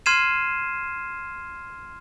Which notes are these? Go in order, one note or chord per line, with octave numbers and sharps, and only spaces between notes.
C6 F6 G#6 C7 D#7 E7